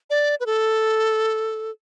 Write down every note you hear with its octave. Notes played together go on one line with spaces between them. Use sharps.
D5
B4
A4